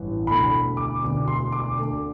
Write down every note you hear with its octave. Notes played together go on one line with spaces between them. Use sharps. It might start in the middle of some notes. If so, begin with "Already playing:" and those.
Already playing: A1 G2 E3
E1 D2 D3 B5
D6
E1 D2 D3
C6
D6
D2 D3